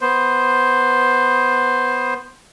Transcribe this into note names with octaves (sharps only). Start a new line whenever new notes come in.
B3 C5